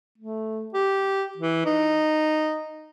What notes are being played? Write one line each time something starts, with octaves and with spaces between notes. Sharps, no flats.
A3
G4
E3
D#4